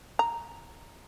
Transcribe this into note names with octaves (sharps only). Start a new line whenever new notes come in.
A#5